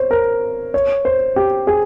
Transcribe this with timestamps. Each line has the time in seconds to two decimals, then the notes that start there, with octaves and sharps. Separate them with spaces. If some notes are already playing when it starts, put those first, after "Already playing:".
Already playing: C5 C#5
0.11 A#4
0.74 C#5
1.05 C5
1.36 G4
1.67 G#4